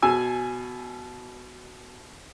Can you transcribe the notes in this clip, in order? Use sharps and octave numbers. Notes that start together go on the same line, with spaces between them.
B2 G#5 E6